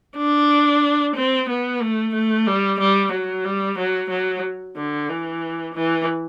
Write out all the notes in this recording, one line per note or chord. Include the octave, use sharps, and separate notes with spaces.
D4
C4
B3
A3
A3
G3
G3
F#3
G3
F#3
F#3
D3
E3
E3